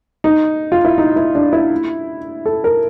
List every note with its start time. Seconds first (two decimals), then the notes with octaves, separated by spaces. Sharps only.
0.24 D#4
0.72 F4
0.85 E4
0.98 D#4
1.16 E4
1.35 D4
1.53 E4
2.46 A4
2.64 A#4